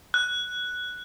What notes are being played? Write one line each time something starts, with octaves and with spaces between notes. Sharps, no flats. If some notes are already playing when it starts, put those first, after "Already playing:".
F#6